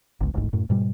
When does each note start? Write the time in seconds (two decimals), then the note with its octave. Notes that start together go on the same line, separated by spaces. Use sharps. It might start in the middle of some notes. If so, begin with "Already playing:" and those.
0.21 G1 C#2
0.33 D1 A1 G#2
0.53 F#2 A2
0.70 G#2 B2 G3